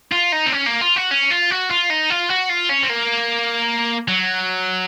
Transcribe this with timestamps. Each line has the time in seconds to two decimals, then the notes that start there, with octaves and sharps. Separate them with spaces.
0.12 F4
0.32 D#4
0.46 C4
0.52 C#4
0.66 A#3
0.82 F4
0.96 F#4
1.11 C#4
1.31 F4
1.51 F#4
1.71 F4
1.90 D#4
2.10 F4
2.30 F#4
2.50 F4
2.70 C#4
2.83 C4
2.90 A#3
4.08 F#3